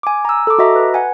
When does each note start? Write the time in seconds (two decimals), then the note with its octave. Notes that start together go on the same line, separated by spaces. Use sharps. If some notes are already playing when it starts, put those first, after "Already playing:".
0.03 G#5 D6
0.25 A#5 E6
0.47 A4 D6
0.59 F#4 D#5 E5 A#5
0.76 B4
0.94 F#5 G#5